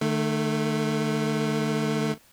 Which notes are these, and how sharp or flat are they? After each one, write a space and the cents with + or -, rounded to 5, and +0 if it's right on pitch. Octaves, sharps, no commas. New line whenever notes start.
D#3 -45 A3 +0